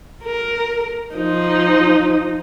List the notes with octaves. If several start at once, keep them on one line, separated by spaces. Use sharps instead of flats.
A#4
F3 D#4